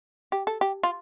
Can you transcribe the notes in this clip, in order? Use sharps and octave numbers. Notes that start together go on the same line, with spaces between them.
G4
A4
G4
F4